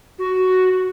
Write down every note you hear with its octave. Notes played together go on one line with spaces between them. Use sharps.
F#4